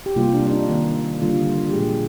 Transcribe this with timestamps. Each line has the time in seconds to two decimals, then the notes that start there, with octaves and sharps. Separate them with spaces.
0.06 G4
0.16 C3 G3 A#3 F4
0.34 D4
0.47 D4
0.52 D#4
0.69 D#3 A#3
1.21 D3 G3 A#3 F4
1.69 G4
1.74 A#2 F3 G#3 G#4